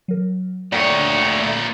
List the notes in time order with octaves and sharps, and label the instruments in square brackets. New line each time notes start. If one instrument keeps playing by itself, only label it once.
[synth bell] F#3 A#4
[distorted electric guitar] A#2 C#5 [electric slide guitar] A3 D5 [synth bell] F#5 G5